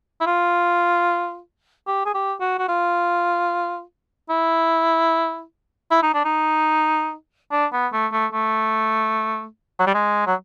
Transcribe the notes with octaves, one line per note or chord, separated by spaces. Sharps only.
E4
F4
G4
G#4
G4
F#4
F#4
F4
E4
E4
D#4
D4
D#4
D4
B3
A3
A3
A3
F#3
G3
G#3
F#3